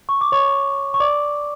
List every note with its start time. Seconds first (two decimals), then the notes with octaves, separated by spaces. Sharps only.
0.09 C#6
0.21 D6
0.32 C#5 C#6
0.94 C#6
1.00 D5 D6